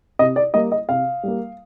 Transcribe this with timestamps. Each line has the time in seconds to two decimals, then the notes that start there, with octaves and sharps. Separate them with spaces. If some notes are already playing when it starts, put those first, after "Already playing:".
0.19 C3 D#5
0.36 D5
0.54 G3 A#3 D#5
0.72 D#5
0.89 C3 F5
1.23 G3 A#3